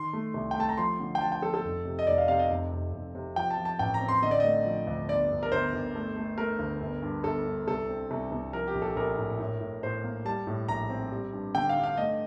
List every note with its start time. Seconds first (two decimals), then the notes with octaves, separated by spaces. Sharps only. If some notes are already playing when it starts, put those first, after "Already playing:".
Already playing: D#3 C6
0.13 A3
0.34 C2
0.51 G5
0.56 A3 A5
0.69 A#5
0.78 F3 C6
1.00 D3
1.15 G5
1.21 F3 A5
1.32 G5
1.42 F3 A4
1.54 A4
1.64 F1
1.85 C3
1.99 D#5
2.07 F1 D5
2.18 F5
2.28 C3 F5
2.39 D#5
2.50 F1
2.72 F1
2.93 F1
3.15 C3
3.36 F3 G5
3.50 A5
3.58 F3
3.65 A5
3.79 A1 G5
3.94 A#5
4.01 C4
4.09 C6
4.22 D3 D#5
4.31 D5
4.40 A3 D#5
4.65 F3
4.87 D2
5.09 G1 D5
5.30 G1
5.43 A#4
5.52 G1 C5
5.73 G1
5.95 A3
6.16 A3
6.38 A3 A#4
6.59 D2
6.81 G1
7.02 G2
7.24 G1 A4
7.46 G2
7.67 C2 A4
7.89 C4
8.11 C2
8.32 C2
8.53 F3 A#4
8.68 G4
8.75 A#1
8.82 A4
8.96 A#1 A#4
9.18 A2
9.39 A2
9.61 A2
9.83 A2 C5
10.04 A#3
10.25 G3 A5
10.47 A2
10.68 A#1 A#5
10.90 C4
11.12 G3
11.33 G2
11.55 D3 G5
11.69 F5
11.76 G2
11.84 F5
11.97 A3 D#5